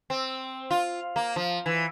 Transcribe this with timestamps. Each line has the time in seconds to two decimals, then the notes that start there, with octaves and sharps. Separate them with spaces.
0.10 C4
0.71 F4
1.16 A#3
1.36 F3
1.66 E3